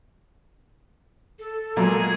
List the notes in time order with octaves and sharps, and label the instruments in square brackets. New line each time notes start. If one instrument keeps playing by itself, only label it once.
[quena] A4
[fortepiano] A#2 [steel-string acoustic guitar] F#3 B3 [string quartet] G#3 A#3 G#4